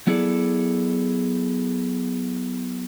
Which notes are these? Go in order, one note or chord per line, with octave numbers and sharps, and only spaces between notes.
F#3 B3 E4 G#4 A4 D5